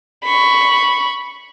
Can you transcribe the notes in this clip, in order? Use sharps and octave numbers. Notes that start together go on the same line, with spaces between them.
B5 C#6